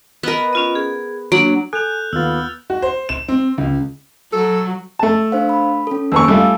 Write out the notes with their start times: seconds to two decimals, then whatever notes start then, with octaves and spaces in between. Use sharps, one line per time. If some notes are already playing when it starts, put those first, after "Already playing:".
0.23 B3 A#4 B4 D#5
0.53 C#4 F4 D#5
0.75 G#4
1.32 F#3 A#3 D4
1.73 A4 G#5 F#6 G6 F7
2.13 D#2 B3 F4 E6 F6 A6
2.70 F#4
2.82 C5
3.09 E7
3.28 C4
3.58 C#2
4.33 F#3 A4
4.99 A3 A5
5.32 D4 C5 F5
5.49 B5
5.87 C#4 A4
6.12 D#2 B3 G#5 A5 C#6 E6
6.28 G3 A3 F4